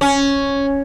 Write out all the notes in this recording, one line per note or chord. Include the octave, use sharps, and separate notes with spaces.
C#4